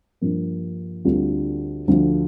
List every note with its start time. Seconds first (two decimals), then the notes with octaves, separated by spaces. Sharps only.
0.21 G2 F3 A#3
1.05 D2 D3 G3 C4 F4
1.88 D2 D3 F3